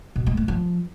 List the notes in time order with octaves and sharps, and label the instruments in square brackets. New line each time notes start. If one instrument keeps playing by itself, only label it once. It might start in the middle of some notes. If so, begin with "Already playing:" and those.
[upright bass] B2
G#3
A3
F3